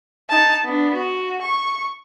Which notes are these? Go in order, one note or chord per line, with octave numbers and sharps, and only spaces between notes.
D#4 A5
B3 D4
F#4
C#6